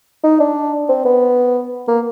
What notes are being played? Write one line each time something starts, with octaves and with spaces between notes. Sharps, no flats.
D#4
D4
C4
B3
A#3